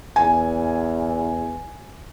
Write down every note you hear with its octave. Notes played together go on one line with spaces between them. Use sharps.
E2 G#5